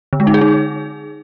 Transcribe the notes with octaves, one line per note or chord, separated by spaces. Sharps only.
D3
G#3
D#4
G#4
D#4